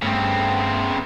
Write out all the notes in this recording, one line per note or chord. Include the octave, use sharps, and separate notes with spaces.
G2 C#3 A3 B3 C4